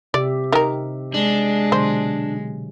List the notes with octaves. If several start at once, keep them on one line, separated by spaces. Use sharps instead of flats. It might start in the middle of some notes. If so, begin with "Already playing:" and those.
C3 G4 D5 E5
D#3 A#4
G#3 D4
B2 D3 F#3 C5